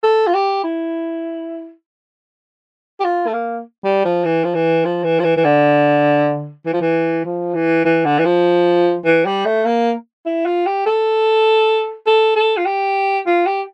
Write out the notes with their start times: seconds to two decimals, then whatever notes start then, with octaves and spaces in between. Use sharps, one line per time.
0.03 A4
0.26 F4
0.34 G4
0.64 E4
3.00 G4
3.04 F4
3.27 A3
3.33 A#3
3.84 G3
4.05 F3
4.24 E3
4.44 F3
4.54 E3
4.85 F3
5.04 E3
5.19 F3
5.24 E3
5.37 E3
5.44 D3
6.65 E3
6.73 F3
6.81 E3
7.25 F3
7.54 E3
7.85 E3
8.05 D3
8.18 E3
8.25 F3
9.05 E3
9.25 G3
9.45 A3
9.65 A#3
10.25 E4
10.45 F4
10.66 G4
10.86 A4
12.07 A4
12.36 A4
12.57 F4
12.66 G4
13.26 F4
13.46 G4